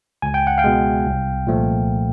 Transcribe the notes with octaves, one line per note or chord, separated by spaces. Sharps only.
C#2 G#5
G5
F#5
F5 G5
B2 G#3
C2
A#2 F3 A3